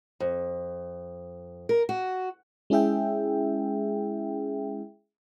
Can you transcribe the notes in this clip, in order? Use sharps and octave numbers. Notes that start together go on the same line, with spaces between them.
F2
A#4
F#4
G#3 C#4 E4 G#4 E5 G5